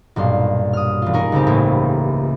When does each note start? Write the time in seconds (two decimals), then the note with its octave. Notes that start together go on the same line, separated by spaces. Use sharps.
0.16 B1 G2 A#2 C6
0.73 D#6 F6
1.02 E1 F4
1.13 C#4 D#4 G#4 A#4
1.32 C#2 C#3 C4 G4
1.47 A1 A2 A#3